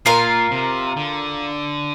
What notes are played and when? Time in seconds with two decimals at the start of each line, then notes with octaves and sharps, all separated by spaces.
0.06 A#2 F4 A#4 F5
0.51 C3
0.97 D3